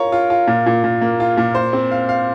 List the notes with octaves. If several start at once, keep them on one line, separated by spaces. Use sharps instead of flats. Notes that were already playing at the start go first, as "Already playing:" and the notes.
Already playing: F4 A#4 C#5
F4
F4
A#2
A#2
A#2
A#3
F4
A#2
C5
C4
F5
F5